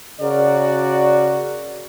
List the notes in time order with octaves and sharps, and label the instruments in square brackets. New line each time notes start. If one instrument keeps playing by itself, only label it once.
[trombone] C#3 [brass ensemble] F#4 A#4 D5